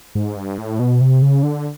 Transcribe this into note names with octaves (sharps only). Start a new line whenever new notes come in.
G#2
G2
A2
B2
C3
C#3
D3